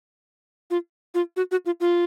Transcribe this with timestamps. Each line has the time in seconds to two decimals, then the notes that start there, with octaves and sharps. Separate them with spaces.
0.71 F4
1.14 F4
1.37 F#4
1.51 F#4
1.66 F4
1.80 F4